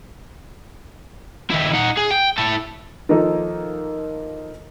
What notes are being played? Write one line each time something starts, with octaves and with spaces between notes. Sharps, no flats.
D#3 E4
D#4 F#5
G#4
G5
E4 A4
D#3 F3 A#3 D#4 A4 A#4